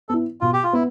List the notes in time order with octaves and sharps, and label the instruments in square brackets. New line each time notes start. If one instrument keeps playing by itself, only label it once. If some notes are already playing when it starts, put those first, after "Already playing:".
[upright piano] B3 E4 [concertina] A4
[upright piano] B2 [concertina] F4
[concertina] G4
F4
[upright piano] B3 [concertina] E4